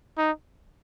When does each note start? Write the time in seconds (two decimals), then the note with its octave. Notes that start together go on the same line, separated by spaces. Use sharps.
0.18 D#4